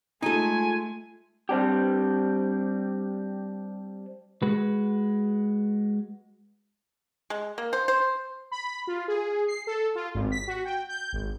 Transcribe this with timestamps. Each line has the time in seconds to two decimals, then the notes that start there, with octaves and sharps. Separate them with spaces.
0.22 G#3 A3 D#4 F4 A4 G#5
1.49 G3 C4 D4 G4
4.42 G#3 F#4 B4
7.30 G#3
7.58 A#3
7.73 C5
7.88 C5
8.51 B5
8.87 F4
9.08 G#4
9.48 C7
9.67 A4
9.95 F4
10.14 G#1
10.31 B6
10.47 F#4
10.65 G5
10.89 G6
11.13 G#1